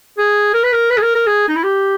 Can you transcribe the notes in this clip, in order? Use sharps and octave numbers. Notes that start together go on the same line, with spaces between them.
G#4
A#4
B4
A#4
B4
G#4
A#4
A#4
G#4
D#4
E4
G4